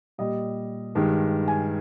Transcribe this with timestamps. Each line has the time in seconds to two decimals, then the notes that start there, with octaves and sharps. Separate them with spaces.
0.18 A#2 G3 D#5
0.95 G2 D#3 G#3
1.48 G#5